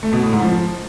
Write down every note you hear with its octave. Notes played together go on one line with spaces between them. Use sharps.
A3
B2
A2
G#2
F3